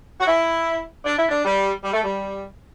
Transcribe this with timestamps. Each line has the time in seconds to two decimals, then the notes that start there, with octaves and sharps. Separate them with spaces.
0.20 F#4
0.27 E4
1.05 D4
1.17 E4
1.29 D4
1.45 G3
1.84 G3
1.93 A3
2.02 G3